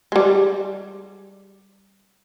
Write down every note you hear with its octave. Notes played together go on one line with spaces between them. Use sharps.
G3 G#3